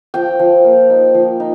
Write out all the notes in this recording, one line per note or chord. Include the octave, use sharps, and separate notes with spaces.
F3 G5
F3
A#3
D#4
F3
D#4